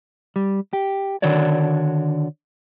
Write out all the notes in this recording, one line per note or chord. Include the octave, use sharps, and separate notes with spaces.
G3
G4
D3 D#3 D4 F#4 C#5 D5